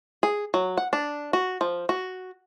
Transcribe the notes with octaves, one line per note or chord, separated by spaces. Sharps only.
G#4
F#3
F#5
D4
F#4
F3
F#4